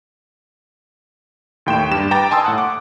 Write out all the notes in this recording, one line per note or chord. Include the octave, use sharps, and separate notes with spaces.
D#2 A2 G5 C6 G6 E7
G2 G4 E7
B4 G5 A#5 D6 A6
G#5 A5 C6 D#6 E6
A2 F#5 F#6
D6